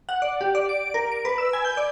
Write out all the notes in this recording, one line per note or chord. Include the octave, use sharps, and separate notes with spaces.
F#5
D5
G4
D5
D7
A#4
D7
B4
E6
G#5
G6
D5